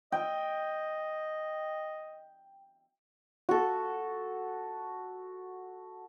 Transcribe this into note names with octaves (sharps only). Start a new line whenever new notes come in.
D#5 G5
F#4 A4